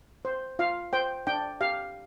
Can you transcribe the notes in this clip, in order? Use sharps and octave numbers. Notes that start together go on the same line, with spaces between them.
C5
F4 F5
C5 G5
D4 G5
G4 F5